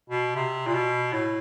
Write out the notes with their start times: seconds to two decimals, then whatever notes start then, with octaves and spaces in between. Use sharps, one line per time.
0.10 B2
0.36 C3
0.67 A#2
0.73 B2
1.13 A2